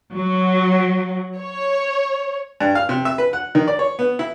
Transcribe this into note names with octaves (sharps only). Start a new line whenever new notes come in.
F#3
C#5
G2
F5
C3
E5
B4
F#5
D#3
D5
C#5
B3
E4